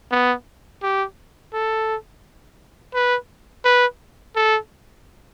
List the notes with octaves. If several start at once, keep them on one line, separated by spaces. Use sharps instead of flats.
B3
G4
A4
B4
B4
A4